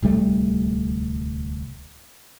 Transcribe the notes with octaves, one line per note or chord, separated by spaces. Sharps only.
D1 C2 G3 A3